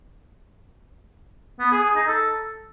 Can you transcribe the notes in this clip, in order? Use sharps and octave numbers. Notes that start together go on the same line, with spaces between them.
B3
G#4
G#4
D#4
A4